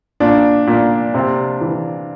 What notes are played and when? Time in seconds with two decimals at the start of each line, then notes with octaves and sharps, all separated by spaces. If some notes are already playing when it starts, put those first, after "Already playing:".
0.20 A#2 D4
0.67 A#2
1.14 C3
1.61 E3